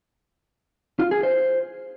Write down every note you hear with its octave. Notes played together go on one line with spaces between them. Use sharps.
F4
G#4
C5